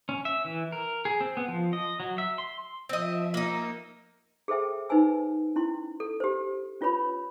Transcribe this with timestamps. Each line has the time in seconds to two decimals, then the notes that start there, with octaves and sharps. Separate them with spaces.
0.09 C#4
0.25 E5
0.45 E3
0.72 A#4
1.05 G#4
1.21 C4
1.37 B3
1.48 F3
1.73 D#5
2.00 F#3
2.18 E5
2.38 C6
2.89 F3 C4 D#5 E5
3.34 A#3 D#4 A#4 E6 A#6
4.48 G#4 A4 C5 E5 G5
4.89 D#4 B4 C5 G#5 E6
5.56 C#4 E4 C6
6.00 A4
6.20 G4 C5
6.81 C#4 F4 B4 C#5 B5